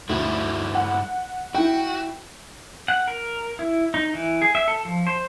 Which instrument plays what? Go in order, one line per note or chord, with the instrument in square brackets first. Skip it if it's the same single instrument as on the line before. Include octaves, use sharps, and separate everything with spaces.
[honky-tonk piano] D2 [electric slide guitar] G2 E4 F#4
[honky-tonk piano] F#5
[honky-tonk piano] E4 G5 [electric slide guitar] F#4
[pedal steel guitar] F#5
A#4
E4
D#4
E3
G#4
E5
A4
F3
C5